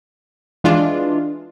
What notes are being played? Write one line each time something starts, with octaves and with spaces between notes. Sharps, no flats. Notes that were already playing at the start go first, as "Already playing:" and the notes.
E3 G#3 D4 F4